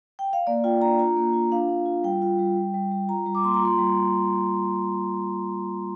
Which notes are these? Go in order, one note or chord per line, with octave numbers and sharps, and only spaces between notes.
G5
F5
A#3 D5
F4 G5
D4 A#5
F4 A#5
A#3
F4
D4 F5
D4
F4
G3 G5
F4
G3
G3
G3
G3
F4 A#5
G3
D6
A#3 C6
A#5
F4 C6
G3